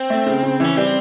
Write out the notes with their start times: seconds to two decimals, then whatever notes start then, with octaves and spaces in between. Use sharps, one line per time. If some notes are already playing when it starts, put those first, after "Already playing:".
Already playing: C4
0.10 A3
0.26 C#3
0.43 C#3
0.60 E3 C#4
0.77 G3 C4